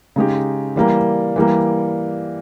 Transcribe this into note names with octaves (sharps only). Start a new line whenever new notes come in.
C#3 G#3 D#4 G4
E3 G3 A#3
E3 G3 A#3